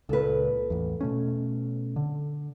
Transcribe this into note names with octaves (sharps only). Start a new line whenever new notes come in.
C#2 A#2 A4 B4
A1 E2
B2 A3 C#4
D3